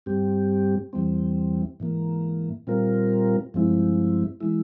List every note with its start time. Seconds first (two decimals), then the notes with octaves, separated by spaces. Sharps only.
0.06 G2 G3 C4 G4
0.93 E2 E3 G3 C4
1.80 G#2 E3 A#3
2.67 A#2 G3 C4 F4 A#4
3.54 G2 F3 G#3 C4 E4
4.41 E3 G#3 E4